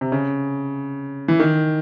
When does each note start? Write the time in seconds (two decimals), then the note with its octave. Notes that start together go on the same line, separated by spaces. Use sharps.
0.01 C3
0.12 C#3
1.28 E3
1.40 D#3